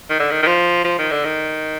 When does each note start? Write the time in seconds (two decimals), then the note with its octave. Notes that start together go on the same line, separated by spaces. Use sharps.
0.10 D#3
0.20 D3
0.31 D#3
0.43 D#3
0.47 F3
0.85 F3
0.99 D#3
1.11 D3
1.25 D#3